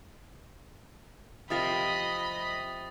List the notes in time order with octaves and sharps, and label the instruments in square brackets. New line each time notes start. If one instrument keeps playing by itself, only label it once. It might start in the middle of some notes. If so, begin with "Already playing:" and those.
[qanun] C3 F3 A#4 [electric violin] D#5 B5 [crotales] D#6 A6